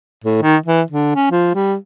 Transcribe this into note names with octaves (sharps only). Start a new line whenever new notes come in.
A2
D#3
E3
D3
C#4
F3
G3